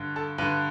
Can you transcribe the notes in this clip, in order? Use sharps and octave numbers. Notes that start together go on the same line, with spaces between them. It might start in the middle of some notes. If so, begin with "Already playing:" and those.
Already playing: G2 D3
A4 A5
G2 D3 B4